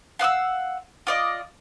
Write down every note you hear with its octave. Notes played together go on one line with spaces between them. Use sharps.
F5 F#5 D#6 E6
F4 D5 D#5